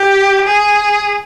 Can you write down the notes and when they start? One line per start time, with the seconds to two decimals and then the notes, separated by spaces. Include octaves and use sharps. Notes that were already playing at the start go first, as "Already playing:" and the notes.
Already playing: G4
0.47 G#4